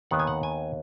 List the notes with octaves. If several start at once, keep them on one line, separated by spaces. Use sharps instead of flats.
D#2 D#3 B3 F#5
G#5
F#5
G#5